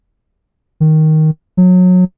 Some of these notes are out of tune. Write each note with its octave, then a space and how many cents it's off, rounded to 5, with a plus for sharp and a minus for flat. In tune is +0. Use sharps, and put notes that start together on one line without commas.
D#3 +5
F#3 -25